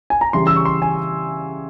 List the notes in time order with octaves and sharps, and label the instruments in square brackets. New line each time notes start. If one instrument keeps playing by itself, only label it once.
[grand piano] G#5
A#5
C#3 E3 G3 C6
E6
C#6
C6
G#5